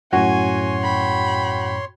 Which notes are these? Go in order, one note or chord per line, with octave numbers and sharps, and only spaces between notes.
F#2 A2 F#4 C#5 G#5 C6
G5 B5